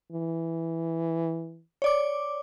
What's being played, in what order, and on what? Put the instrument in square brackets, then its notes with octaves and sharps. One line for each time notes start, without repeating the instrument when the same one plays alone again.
[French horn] E3
[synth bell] C#5 D5 D6